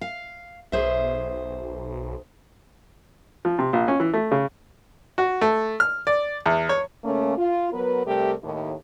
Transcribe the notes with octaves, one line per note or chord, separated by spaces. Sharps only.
F5
B1 G#4 C5 E5
F3
C3
A#1
C#4
E3
A3
C#3
F#4
A3
F6
D5
E2
C#5
C#3 A3 A#3 C#4
F4
F#3 B3 A#4 B4
C3 G3 A3 G4 A4 A#4
D#2 A2